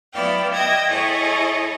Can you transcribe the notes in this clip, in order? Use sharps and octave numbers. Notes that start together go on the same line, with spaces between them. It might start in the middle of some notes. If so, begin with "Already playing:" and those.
F#3 B3 E4 D5 F5 G5
D#5 E5 G5 G#6 A#6
E4 G#4 A4 C#5 D#5